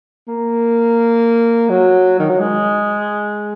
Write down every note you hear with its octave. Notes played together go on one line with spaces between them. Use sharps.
A#3
F#3
D#3
F#3
G#3